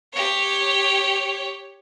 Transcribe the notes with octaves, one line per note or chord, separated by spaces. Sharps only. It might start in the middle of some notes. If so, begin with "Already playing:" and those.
G4 C#5